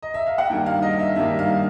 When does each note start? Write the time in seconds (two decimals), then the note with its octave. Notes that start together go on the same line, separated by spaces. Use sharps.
0.03 D#5
0.14 E5
0.27 F5
0.38 F#5
0.50 G2 D#3 G3 A#3 G5
0.66 F5
0.82 D#5
0.93 F5
0.99 E5
1.15 G2 D#3 G3 A#3 E5
1.39 F5